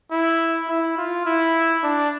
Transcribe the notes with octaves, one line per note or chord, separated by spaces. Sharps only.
E4
E4
F4
E4
D4